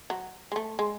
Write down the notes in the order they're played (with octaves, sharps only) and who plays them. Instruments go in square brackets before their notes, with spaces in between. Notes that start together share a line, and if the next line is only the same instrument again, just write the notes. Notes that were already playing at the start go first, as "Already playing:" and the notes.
[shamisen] F#3
G#3
A3
G#3